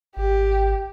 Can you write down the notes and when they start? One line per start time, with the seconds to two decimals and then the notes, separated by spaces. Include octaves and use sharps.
0.17 G#1 G4